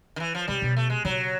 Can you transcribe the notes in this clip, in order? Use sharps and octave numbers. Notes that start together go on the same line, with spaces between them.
D#3
E3
F3
C3 G3
B2
A3
G#3
C#3 F#3